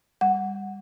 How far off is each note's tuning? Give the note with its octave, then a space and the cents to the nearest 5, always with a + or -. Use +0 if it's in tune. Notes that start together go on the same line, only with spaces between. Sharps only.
G3 +25 F#5 +0